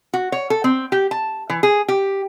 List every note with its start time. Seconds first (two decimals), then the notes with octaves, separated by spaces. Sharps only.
0.14 F#4
0.32 C#5
0.50 A4
0.64 C4
0.92 G4
1.11 A5
1.50 E3
1.63 G#4
1.88 G4